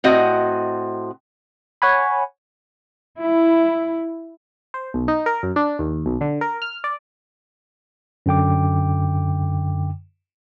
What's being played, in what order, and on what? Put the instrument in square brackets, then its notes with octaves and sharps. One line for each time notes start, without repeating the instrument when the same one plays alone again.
[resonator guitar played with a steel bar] A2 C4 F#4 D#5
[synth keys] C#5 F#5 G#5 B5
[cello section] E4
[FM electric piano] C5
B1
D#4
A#4
F#2
D4
D#2
B1
D3
A#4
F6
D5
[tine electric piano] F#2 D3 G5 D6